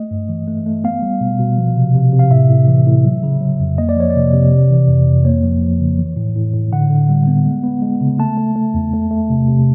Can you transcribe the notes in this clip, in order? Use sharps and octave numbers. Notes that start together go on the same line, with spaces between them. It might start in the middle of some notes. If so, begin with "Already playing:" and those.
Already playing: A3 D#5
G2
E3
A3
A3
B3 F5
G3
B2
B2
F3
C3
C3
C3
F5
A2 E5
A2
E3
A2
F#3
C#3
F#3
F2
A#3 D#5
D5
F3 C#5
C3 D5
C3
C3
E3
F2
F2
A#3 C#5
F3
F3
C#3
E3
A2
A2
A2
D3 F#5
D3
G3
B3
G#3
B3
G#3
C#3
A3 A5
A3
A3
E2
A3
A3
C3
C3